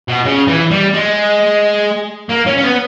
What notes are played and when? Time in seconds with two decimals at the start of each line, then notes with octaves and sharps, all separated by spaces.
0.08 B2
0.25 C#3
0.48 E3
0.71 G3
0.94 G#3
2.29 A#3
2.47 C#4
2.58 C#4
2.64 B3